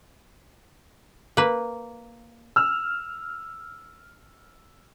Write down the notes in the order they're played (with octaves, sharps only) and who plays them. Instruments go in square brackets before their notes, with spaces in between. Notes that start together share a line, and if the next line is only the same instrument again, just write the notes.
[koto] A#3 B4
[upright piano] E6 F6